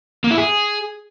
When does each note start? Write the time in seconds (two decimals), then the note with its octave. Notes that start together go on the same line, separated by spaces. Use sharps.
0.24 A#3
0.31 E4
0.38 G#4